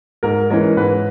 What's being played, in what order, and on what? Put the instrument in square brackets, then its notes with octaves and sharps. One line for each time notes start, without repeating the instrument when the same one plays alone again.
[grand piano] G#2 [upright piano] A#4
[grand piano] E3 G#3 C#4 [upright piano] A#4
[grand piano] G#2 [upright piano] B4